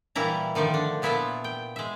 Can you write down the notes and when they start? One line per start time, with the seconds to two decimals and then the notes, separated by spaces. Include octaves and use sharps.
0.16 A#2 E3 G3 E4 A#5
0.55 D3 D#3 F3 A3
0.74 D4
1.02 A#2 B3 E4 F4 E5 A5
1.44 G5
1.76 G#3 E5